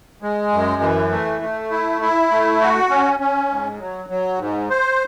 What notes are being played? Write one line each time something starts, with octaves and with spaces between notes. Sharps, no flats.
G#3
F#2
E3
A3
A3
E4
E4
A3
F#4
C#4
C#4
G#2
F#3
F#3
G#2
C5